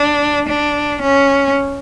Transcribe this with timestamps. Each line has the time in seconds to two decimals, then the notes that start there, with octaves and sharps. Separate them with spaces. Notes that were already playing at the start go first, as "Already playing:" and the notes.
Already playing: D4
0.49 D4
1.03 C#4